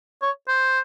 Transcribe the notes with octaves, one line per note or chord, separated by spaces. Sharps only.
C#5
C5